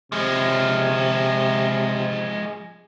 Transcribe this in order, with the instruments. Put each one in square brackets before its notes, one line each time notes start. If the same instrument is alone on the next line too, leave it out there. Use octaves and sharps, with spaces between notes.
[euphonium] C3 [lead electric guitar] F3 G#3